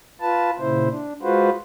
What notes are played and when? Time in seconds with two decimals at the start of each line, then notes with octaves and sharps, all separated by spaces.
0.21 F4 B4 A5
0.59 A#2 C#3 E4 C5
0.89 D4
1.23 G#3 F4 F#4 B4 C5